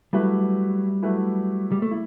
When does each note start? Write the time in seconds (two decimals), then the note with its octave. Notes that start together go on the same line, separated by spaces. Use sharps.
0.13 F#3 G3 A3 E4 B4
1.02 F#3 A3 E4 B4
1.72 G3
1.82 A3
1.91 E4